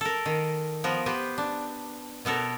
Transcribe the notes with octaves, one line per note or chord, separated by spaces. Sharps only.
A4 A#4
D#3
F3 B3 A#4
B3 G4 B4 C5
D4
B2 B3 A4 A#4 C#5